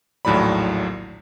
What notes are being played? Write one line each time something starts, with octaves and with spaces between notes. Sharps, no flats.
A#1 D#2 A2 F#3 D5 B5